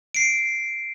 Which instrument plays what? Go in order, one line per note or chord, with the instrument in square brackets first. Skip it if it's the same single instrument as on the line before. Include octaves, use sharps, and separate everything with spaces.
[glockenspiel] C7 D7